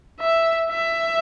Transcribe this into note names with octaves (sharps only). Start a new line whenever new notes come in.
E5
E5